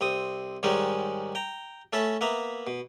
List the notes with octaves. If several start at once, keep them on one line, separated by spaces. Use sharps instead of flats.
C2 C4 D#6
G#2 D#3 G3 G#3 C#4 D#4
G5 A#5
A3 C#4 A4 A5 B5
A#3 B3 E5 A#5
B2